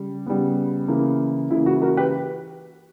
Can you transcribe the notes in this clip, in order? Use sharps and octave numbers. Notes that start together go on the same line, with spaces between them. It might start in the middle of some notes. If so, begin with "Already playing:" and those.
Already playing: C#3 G3
C#3 G3 B3
C#3 E3 A#3
C#3 E3 A#3 E4
F#4
F#4 A#4
G4 B4